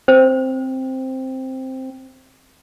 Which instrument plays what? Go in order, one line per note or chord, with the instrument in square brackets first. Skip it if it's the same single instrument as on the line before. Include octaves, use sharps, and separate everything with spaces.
[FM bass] C4 [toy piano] C5